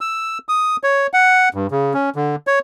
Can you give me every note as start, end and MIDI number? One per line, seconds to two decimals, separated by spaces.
0.01 0.38 88
0.49 0.76 87
0.84 1.07 73
1.14 1.49 78
1.54 1.67 43
1.71 1.93 49
1.94 2.10 61
2.16 2.36 50
2.47 2.59 73